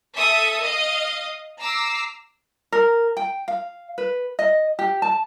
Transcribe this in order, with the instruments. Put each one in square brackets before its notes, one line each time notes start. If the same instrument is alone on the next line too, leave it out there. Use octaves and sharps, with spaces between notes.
[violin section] A4 E5 D#6
D#5 F5
A#5 D6 E6 C7
[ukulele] A#4
G5
F5
B4
D#5
G4
A5